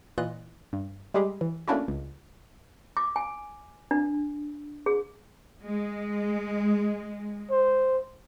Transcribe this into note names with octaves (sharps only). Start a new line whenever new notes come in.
A#2 E3 F4 D#5 F#6
G2
G3 G#3 G4 G#4
E3
A3 A#3 C#4 D4 E4 F#4
C#2
D6
G#5
D4
G#4
G#3
C5